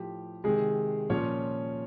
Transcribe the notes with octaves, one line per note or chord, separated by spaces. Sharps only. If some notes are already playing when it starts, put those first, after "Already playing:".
Already playing: A2 F3 G4
C3 D#3 G#3 G#4
A#2 F3 C#4 C#5